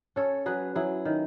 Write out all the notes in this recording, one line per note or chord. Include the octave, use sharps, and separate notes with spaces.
C#4 A4 C#5
F#3 G#4 B4
F#3 E4 G#4
D#3